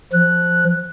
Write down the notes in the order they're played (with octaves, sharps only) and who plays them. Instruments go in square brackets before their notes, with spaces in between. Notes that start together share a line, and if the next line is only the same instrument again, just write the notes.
[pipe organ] F3 F#6